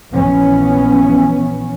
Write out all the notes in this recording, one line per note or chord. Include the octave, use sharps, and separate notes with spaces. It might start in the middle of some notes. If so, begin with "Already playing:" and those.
A#1 E3 B3 C#4